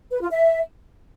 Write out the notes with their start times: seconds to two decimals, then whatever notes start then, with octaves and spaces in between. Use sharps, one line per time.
0.11 B4
0.21 F4
0.30 E5